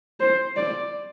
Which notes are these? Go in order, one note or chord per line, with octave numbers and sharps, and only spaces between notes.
C5
D5